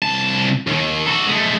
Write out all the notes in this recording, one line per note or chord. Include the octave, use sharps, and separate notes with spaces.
C2 A5
D#2 D#3
F#4 A4
G#3 A3